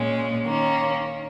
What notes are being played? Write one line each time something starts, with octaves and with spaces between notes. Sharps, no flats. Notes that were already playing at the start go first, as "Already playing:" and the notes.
Already playing: A#2 G#3 C#4
D#3 A#3 C#4